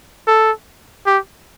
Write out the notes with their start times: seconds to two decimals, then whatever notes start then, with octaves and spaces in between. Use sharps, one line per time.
0.27 A4
1.06 G4